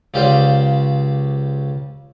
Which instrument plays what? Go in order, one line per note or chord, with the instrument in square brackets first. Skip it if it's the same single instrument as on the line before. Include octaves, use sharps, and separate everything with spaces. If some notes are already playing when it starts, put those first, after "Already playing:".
[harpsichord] C#2 C#3 G4 C5 D5 F5